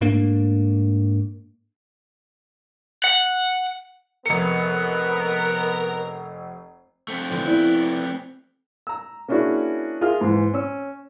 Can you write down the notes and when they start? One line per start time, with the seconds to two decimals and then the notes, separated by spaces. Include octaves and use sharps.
0.01 G#2 A3 A#3 D4
3.04 F#5
4.26 F1 B3 A#4 C#7
7.08 A3 C4
7.30 D3 E3 F3
7.45 B3 E4 D5
8.87 A#5 E6
9.28 A#3 C#4 D4 E4 F#4 G#4
10.01 F4 G#4 A#4 E5 F6
10.21 G#2 E3
10.54 C#4 E6